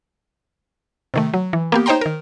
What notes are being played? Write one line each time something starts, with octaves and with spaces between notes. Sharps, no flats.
C3 D#3 A3
F#3
E3
A#3 B3 G4
D#4 C5 C#5 G5 A#5 C6
D#3 A#4